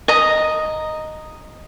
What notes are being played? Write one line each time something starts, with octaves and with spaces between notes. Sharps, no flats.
D#5 A#5